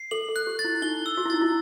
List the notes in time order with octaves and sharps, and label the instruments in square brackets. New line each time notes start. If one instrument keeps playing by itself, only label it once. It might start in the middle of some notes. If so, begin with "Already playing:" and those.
Already playing: [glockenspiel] C7
[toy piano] A4 [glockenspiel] F#7
[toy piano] A4
[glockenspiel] F#6
[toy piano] G4
[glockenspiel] A6
[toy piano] E4
[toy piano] D#4 [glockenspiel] G7
[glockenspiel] E6
[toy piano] F#4
E4
[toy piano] D#4 [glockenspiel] A6
[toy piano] E4